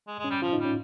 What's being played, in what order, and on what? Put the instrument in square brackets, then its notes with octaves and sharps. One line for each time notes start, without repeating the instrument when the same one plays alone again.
[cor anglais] G#3
G#3
[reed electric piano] C#4
[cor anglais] G3
[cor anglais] F3 [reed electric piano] F4
[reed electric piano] D#4
[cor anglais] G3
[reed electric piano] C#4